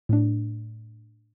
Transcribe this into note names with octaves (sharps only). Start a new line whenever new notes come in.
A2 D4